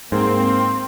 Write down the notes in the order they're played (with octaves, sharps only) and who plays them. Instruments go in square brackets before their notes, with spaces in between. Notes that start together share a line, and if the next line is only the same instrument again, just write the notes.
[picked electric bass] G#2 [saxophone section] A#3 [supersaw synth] C4 [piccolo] C6